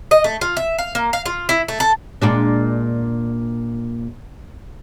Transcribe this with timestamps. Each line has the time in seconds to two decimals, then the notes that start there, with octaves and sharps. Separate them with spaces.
0.11 D#5
0.24 A3
0.41 F4
0.57 E5
0.78 F5
0.95 A#3
1.13 F5
1.26 F4
1.49 E4
1.68 A3
1.80 A4
2.22 A#2 G#3 D4